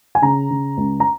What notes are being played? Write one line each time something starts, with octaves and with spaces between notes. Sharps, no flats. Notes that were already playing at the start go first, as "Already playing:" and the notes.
G#5
C#3 A#5
C#3
C#2
A#5